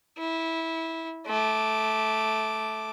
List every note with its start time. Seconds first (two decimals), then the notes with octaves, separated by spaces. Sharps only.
0.17 E4
1.26 A3 D6